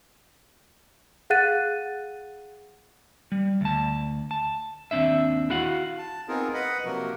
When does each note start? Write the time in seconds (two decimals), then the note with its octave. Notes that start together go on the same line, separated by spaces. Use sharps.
1.30 G#4 F5 F#5 F#6 A6 D#7
3.32 G3
3.61 D2 A5
4.31 A5
4.91 D#2 D3 C4 D4 E5
5.50 E4 F#4 F5 F#5
5.98 A5
6.28 B3 C4 D#4 F4 G#4 A#4
6.54 B4 D#5 F#5 B5
6.85 C3 F3 F#3 A#3 F#4 A#4